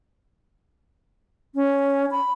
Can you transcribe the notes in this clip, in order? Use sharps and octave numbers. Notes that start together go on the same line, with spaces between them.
C#4
B5